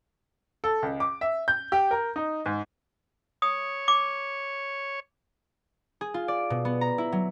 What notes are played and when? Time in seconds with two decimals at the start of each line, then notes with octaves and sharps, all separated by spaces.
0.64 A4
0.82 C#2
1.00 D6
1.21 E5
1.48 G6
1.72 G4
1.91 A#4
2.16 D#4
2.46 G#2
3.42 C#5 D#6
3.88 D6
6.01 G#4
6.14 F4
6.28 D5
6.50 B2
6.65 B3
6.81 A#5
6.98 E4
7.12 F#3